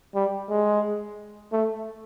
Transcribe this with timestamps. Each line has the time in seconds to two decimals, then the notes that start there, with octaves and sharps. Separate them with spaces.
0.15 G3
0.49 G#3
1.52 A3